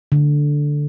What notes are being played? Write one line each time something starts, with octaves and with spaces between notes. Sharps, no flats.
D3